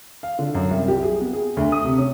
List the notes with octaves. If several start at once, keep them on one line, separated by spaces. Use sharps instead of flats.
F5
D3
F#2
C2
G4
G#4
B3
G#4
D2
D#6
C3
C#4